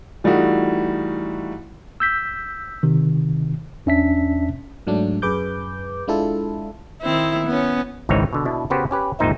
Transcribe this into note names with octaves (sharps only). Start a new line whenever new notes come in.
E3 G3 A3 D#4 F4 F#4
E6 G6 B6
C3 D#3
E2 C#4 D4 E5 A5 B6
G#2 F#3 A3 D4
F#2 G#4 B4 D6 G6
G#3 D4 E4 F4 A4
D#3 C4 E4
B3 C#4
G#1 C#2 E3 C4 D#4 C#5
B2 D3
B2 D4 E4
C#3 B3 F#4 G4 B4 C5
C#4 G4 B4
G#1 E2 A#2 D#4 C5 E5